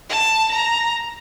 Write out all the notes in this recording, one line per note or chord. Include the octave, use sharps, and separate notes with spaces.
A5
A#5